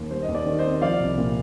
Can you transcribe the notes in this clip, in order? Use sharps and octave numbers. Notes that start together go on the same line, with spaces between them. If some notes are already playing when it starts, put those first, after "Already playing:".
Already playing: D#2
G3 C5
D#5
D#2
D5
D#3
C5 D#5
C4
F3 D5 F5
C2
A#2